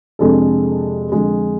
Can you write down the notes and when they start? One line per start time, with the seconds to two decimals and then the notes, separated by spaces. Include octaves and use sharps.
0.19 F2 C3 G#3 D4 A4
1.12 F2 D3 G#3